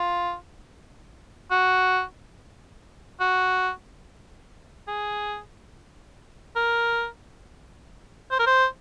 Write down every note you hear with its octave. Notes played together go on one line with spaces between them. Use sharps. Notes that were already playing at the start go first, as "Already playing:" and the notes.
Already playing: F4
F#4
F#4
G#4
A#4
C5
A#4
C5